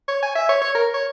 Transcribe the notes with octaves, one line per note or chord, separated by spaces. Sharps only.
C#5
G#5
E5
C#5
C#5
A#4
C#5